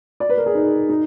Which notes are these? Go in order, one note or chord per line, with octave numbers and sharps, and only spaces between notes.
D5
B4
A#4
G#4
D#4
D#4